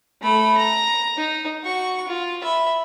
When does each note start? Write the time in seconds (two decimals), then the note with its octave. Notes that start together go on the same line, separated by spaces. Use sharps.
0.22 A3 B5
0.58 A#5
1.17 D#4
1.63 F#4 C#6
2.08 F4
2.43 E5 B5